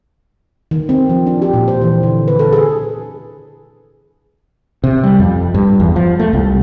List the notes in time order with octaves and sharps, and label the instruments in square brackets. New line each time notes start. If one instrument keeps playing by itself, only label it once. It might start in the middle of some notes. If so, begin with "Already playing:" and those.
[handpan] D#3
C4
F3
D4
G4
A#2
C5
E3
D3
B4
A4
G#4
[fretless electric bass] C3
G3
F2
G2
E2
F3
A3
C2